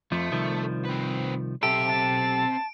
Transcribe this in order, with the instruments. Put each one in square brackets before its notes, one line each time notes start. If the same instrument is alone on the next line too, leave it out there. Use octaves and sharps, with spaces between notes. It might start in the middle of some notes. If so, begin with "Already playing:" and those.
[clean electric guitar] F2 F3 [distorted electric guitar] A3
[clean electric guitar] C2 D#3 F3
[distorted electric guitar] C4 B4
[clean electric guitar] B1 G4 A4 [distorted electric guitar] C4 E5 [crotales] D7
[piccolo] A5